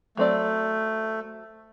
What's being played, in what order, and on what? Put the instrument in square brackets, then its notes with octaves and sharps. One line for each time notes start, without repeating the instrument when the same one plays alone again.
[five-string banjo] F#3 C4 D5 [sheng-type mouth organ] A3